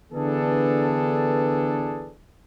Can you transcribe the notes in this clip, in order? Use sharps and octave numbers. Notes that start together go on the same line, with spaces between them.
D3 E3 B3 D4 G#4 A4